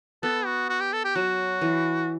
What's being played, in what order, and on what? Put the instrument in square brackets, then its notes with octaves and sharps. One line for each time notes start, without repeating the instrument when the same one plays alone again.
[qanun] B3 [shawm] A4
[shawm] F#4
F#4
G4
A4
G4
[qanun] F#3 [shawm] F#4
[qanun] E3